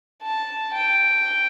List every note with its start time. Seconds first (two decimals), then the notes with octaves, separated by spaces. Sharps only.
0.23 A5
0.74 G5